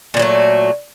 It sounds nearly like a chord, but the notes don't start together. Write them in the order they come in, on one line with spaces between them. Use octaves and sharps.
A#2 E3 F#3 A3